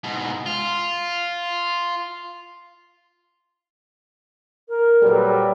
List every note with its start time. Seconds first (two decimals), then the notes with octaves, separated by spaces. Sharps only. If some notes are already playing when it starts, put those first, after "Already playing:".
0.04 G#2 B2
0.46 F4
4.69 A#4
5.02 A#2 F#3 G3 A4 B4